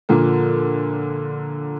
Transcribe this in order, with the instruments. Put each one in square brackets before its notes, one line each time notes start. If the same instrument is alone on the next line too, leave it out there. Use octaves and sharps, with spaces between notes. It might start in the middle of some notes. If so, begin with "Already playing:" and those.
[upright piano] A#2 D3 F3 A#3